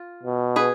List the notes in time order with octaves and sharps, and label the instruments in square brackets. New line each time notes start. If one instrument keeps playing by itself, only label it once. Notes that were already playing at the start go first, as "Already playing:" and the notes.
Already playing: [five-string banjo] F4
[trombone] B2
[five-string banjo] G#4 B4